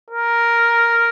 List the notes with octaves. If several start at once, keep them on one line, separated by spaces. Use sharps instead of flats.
A#4